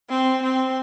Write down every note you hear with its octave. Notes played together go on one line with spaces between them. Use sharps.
C4
C4